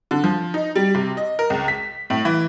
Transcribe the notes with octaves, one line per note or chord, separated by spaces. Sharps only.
D3
F3
D#4
G3
C3
D#5
A#4
C#2
B6
A2
E3